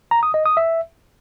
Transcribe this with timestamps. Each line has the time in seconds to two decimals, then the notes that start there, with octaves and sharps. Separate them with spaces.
0.11 A#5
0.23 D#6
0.34 D#5
0.45 D#6
0.57 E5